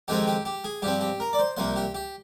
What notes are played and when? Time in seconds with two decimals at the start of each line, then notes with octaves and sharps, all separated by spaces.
0.08 F2 D#3 G#3 C4 F4 G4
0.27 G4
0.45 G4
0.64 G#4
0.82 G2 F3 C4 G4
1.01 G4
1.20 A#4
1.33 D5
1.39 C5
1.57 C2 C3 F3 A#3 C5
1.76 G4
1.94 G4